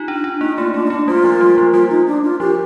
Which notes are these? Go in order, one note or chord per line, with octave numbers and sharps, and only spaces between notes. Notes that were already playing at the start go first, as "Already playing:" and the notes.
Already playing: D#4 F4 G4
D4
D4
A#3 D#4
A3 F4
A3 D4
D#4
A3 D4
G3 F4
F3
G3
F3
G3 F4
D#4
D4
F4
F3 G4